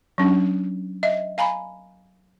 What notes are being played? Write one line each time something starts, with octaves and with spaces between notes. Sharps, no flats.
F#3 C#4 D4
D#5 E5
F5 G#5 A#5 B5